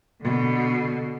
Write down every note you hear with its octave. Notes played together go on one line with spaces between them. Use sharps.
B2 D3